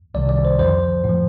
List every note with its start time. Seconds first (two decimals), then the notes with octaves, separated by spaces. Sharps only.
0.14 C2 C3 D#3 G3 D5
0.29 D5
0.45 C5
0.59 F2 D3 F3 C5
1.04 A2
1.09 F3